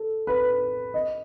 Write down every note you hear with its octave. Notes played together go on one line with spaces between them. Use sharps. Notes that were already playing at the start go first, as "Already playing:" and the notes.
Already playing: A4
B4
D#5